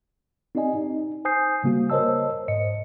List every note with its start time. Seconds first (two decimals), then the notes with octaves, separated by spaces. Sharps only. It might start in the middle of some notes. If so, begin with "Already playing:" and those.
0.55 C4 D#4 G4 D5 D#5 G#5
0.75 D#4
1.25 C5 G#5 D#6 G6 C7
1.64 C#3 G3 A#3 F#4
1.90 A#4 C5 C#5 D#5 A5 E6
2.48 G#2 C5 D#5 C#7